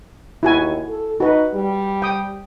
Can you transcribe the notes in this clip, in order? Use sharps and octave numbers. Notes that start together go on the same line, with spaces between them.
D#2 E4 F#4 G#5
A4
D#4 F#4 B4
G3
G5 D#6